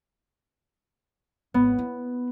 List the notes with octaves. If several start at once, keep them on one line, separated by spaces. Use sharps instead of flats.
G#1 B3
E4